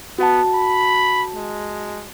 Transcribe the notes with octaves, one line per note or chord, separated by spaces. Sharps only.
B3 F#4 F#5 A5
B5
G#3